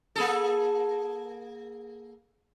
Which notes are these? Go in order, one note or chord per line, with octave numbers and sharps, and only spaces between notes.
A#3 G#4 A4